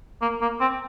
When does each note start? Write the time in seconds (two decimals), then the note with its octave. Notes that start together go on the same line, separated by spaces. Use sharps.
0.22 A#3
0.41 A#3
0.61 C4